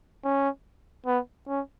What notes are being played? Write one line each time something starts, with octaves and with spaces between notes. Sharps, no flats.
C#4
B3
C#4